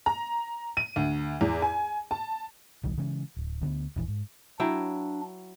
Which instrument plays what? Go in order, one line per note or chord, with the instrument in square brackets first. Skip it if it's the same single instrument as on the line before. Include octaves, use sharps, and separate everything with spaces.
[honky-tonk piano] A#5
D#7
D2
E2
G#5
A5
[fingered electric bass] D1 B1 D#3 G3
C#3 E3 G#3 C#4
D1
D2 D3 A#3 B3
E1 A#1 E3
G#2
[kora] F#3 E4 G5 [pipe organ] D4